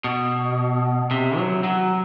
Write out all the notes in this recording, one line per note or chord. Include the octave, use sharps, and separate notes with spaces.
B2
C3
F#3
F#3